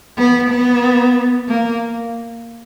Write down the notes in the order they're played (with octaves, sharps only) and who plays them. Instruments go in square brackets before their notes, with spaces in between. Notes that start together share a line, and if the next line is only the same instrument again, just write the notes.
[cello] B3
B3
A#3